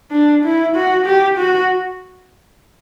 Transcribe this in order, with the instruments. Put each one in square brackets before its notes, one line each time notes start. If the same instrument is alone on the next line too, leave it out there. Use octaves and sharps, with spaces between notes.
[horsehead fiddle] D4
E4
F#4
G4
F#4